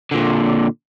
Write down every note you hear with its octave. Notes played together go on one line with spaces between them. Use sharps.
A#2 D3